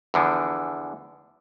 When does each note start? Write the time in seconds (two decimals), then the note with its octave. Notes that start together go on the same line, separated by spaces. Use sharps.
0.14 E2 D3 E3 F3